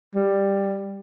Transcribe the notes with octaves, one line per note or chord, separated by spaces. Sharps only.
G3